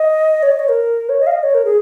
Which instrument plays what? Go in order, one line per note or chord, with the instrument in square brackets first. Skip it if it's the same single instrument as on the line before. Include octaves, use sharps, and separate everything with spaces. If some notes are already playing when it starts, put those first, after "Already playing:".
Already playing: [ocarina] D#5
C#5
D#5
C#5
A#4
C#5
D#5
F5
D#5
C#5
A#4
G#4